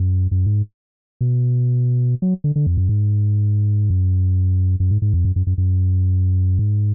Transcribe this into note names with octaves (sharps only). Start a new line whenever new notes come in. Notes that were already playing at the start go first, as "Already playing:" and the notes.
Already playing: F#2
F#2
G#2
B2
F#3
D3
D3
F2
F#2
G#2
F#2
F#2
G#2
G#2
F2
F#2
F#2
F#2
F#2
G#2